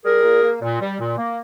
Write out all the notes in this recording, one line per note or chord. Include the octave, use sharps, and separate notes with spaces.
G3 G#4 A#4
A#2
A#3
A#2
G3
A#2
A#3